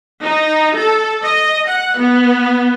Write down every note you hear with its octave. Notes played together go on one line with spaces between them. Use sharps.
D#4
A4
D#5
F#5
B3